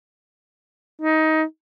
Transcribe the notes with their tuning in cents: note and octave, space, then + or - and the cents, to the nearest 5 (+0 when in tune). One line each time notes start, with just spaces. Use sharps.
D#4 +20